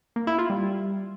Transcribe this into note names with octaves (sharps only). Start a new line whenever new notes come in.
A#3
E4
F4
G3